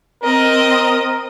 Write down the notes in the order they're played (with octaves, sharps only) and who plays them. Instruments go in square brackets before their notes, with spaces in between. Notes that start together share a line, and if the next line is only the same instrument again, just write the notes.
[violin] C4 D#5 [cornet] A#4